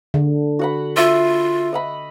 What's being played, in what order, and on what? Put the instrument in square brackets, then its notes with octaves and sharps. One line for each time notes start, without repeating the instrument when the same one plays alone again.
[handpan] D3
[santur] F#4 F#5 B5
[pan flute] F4 [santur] E5
[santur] D#5 F#5 B5